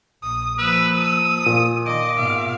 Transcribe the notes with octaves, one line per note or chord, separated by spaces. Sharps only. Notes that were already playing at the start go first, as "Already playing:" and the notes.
A#1 D#6
F3 A#3 B4 E6
D#6
A#2
D#3 D#5 D6
G#2 B2 F5